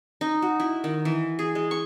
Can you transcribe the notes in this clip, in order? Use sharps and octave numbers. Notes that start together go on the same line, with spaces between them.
D#4
F#4
E4
D#3
E3
G#4
G#3
C#6